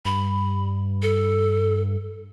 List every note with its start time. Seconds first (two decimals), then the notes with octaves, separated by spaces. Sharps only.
0.05 G2 B5
1.02 A4